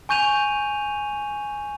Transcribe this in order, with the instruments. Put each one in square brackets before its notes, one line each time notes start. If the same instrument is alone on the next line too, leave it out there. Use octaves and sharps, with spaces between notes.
[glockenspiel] G#5 C#6 G6 D#7 F7